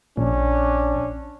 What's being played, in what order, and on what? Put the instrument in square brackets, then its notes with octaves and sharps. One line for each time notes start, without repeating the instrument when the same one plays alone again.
[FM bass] A#1 [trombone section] C#4 D4